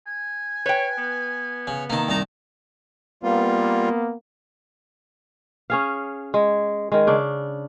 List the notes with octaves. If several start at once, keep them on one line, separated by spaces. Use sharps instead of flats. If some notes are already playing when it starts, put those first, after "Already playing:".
G#5
B4 C#5 G5
B3
C#3
C3 D#3 A#3 A5
C2 D#4 A5 A#5
G3 A#3 B3 F4
C#4 G#4 F5
G#3
D#3 G#3
C#3 D4